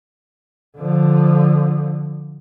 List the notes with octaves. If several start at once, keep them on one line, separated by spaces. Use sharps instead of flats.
D3 F3